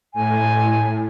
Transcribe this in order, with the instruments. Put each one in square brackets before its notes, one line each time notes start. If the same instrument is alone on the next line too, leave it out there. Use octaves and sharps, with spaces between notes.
[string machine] A2 [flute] G#5